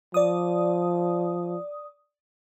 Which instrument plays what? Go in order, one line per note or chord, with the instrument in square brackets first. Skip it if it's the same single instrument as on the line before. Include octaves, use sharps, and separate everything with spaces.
[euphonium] F3 [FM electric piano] D5 D#6